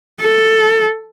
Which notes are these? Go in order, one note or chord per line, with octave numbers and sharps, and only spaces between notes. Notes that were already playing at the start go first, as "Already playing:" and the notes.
A4